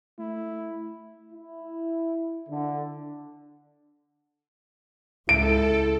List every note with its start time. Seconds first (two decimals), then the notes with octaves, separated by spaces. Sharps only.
0.19 A3 E4
1.33 E4
2.49 D3
5.29 C#2 E4 A4 D7